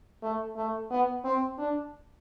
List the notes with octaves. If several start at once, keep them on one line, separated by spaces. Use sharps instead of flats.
A3
A3
B3
C4
D4